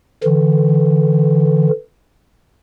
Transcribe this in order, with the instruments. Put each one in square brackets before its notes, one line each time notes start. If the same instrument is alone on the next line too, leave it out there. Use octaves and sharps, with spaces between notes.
[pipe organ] D3 E3